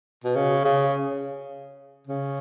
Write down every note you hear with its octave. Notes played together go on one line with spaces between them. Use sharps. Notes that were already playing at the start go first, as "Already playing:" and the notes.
B2
C#3
C#3
C#3